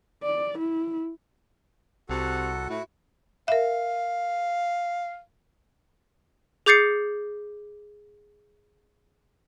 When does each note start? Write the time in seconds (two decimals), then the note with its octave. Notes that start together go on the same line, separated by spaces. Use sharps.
0.23 D5
0.59 E4
2.10 C2 C3 F#4 A4 F#5
2.69 A2 E4 F#4 F#5
3.48 A#4 E5 F5
6.66 G#4 D6 G6 A6 C7 C#7